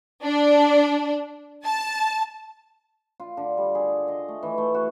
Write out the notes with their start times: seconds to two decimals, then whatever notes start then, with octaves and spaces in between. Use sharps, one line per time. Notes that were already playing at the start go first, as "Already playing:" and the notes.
0.24 D4
1.65 A5
3.20 F4
3.37 D3
3.58 G3
3.75 G#4
4.08 D#5
4.28 A3
4.43 E3
4.58 A3
4.74 F#4